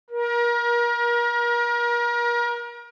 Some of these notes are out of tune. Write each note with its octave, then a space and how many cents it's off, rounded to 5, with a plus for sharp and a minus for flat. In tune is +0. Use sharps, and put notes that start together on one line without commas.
A#4 +30